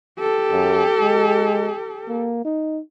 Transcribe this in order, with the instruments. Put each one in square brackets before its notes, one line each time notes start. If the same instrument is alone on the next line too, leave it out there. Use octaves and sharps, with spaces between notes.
[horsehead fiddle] G4 A4
[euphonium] F#2
G#3
A#3
D#4